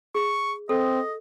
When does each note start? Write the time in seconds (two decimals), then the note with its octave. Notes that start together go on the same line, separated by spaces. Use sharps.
0.15 G#4 C#6
0.69 C4 A4 D#5